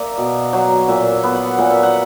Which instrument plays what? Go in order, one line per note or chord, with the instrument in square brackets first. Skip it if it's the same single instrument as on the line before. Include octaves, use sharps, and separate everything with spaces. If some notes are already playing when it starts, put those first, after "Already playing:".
Already playing: [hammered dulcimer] A#3 D5 E5
B2
F#3
A#2 E5
E5
B3
F#5
A#2 F#5
E5
F#5